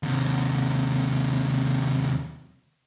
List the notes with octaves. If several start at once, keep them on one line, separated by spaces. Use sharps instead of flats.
D#2 C3